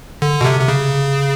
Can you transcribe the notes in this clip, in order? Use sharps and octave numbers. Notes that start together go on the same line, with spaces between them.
D3
B2
C3
C3
C#3